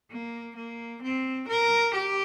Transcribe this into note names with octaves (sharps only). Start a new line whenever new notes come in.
A#3
A#3
C4
A#4
G4